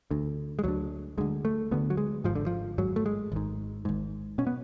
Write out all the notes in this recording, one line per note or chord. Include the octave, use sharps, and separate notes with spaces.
D2 D3
G#3
D2 D3 F#3
D2 D3 G#3
A3
D2 D3 B3
F#3
G#3
G#1 G#2 F3
D3
F3
G#1 G#2 F#3
A3
G#3
G#1 G#2
G#1 G#2
B2 C#4
B3